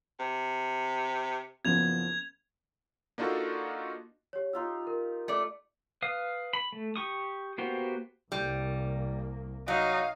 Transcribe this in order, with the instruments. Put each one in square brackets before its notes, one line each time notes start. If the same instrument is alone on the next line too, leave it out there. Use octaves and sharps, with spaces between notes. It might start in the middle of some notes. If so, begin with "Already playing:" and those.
[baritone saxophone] C3
[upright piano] F#1 F3 B3 [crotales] G#6 F7
[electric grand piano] A#3 D4 D#4 F4 F#4 A4
[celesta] G4 C#5
[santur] D#4 F4 G4 [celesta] E6
[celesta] A#4
[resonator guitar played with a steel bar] A3 D5
[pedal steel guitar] B4 F5 D#6
B5
A3
G4 C#6 D#6
A#3 B3 F#4 G4 C5
[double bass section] C2 A#3 [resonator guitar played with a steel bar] G3
[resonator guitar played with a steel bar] F#3 [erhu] D#4 [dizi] F5